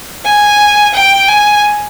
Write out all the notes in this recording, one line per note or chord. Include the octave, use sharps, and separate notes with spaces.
G#5
G5
G#5